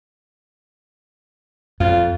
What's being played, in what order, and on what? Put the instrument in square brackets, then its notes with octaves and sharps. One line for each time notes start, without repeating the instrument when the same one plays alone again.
[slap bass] F2 [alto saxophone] F4